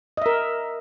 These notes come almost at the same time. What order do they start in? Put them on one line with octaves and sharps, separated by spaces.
D#5 E5 A#4